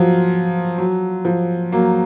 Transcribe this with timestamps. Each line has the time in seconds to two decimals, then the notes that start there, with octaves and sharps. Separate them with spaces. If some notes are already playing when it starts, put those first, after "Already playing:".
Already playing: F3 F#3
0.78 F#3
1.25 F3
1.72 F#3 A#3